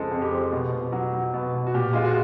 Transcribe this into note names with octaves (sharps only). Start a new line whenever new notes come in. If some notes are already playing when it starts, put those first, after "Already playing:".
Already playing: F2 C#3 F3 G#3 A4 C5
F2
G4
F3
B2
B2
F#3
F#3
B2
B2
F#4
A#2 G4
G#3 F4
F#4